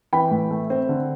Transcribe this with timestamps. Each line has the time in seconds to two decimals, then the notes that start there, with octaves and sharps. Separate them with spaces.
0.13 E3 G5 B5
0.31 A2
0.51 A3
0.70 C4
0.89 D3